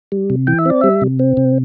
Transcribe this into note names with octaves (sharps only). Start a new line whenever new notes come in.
G3
C3
E3 G5
E5
C4 D5
G3 E5
C3
C4
C3